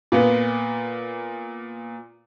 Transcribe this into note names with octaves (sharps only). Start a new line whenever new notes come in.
A#2 A#3 B3